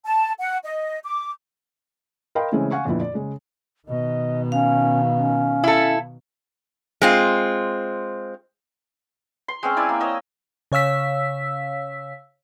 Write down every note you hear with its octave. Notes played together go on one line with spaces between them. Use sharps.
A5
F#5
D#5
D6
A#4 D#5 F5 G5 B5 C6
C#3 E3 G#3 A3 C4 C#4
F5 F#5 G#5 C#6
F2 A#2 D3 F3 B3 E4
D5
C#3 G#3
B2 D#3 D#5
C#4 F5
C#4
E4 A4
G#3 C4 F4
C6
G#3 C4 C#4
E4 D5 G#5 A5
A#3
C#5 D#5 E6
C#3 C#5 F5 E6 B6